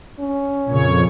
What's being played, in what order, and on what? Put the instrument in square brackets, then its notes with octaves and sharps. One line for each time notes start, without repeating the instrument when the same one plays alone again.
[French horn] C#4
[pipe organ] F2 C#5 [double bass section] A#2 C#3